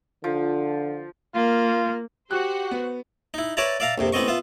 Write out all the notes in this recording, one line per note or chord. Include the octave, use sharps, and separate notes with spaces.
D3 F3
A#3 F4
F#4 G4 C5 F#5 F#6
B3
D#4 E4
B4 C#5 D5 E5 A5 A#5
D5 E5 F5 A5 A#5
A#1 F2 C3
A1 B3 C4 D#5 C#6
B3 F4 E5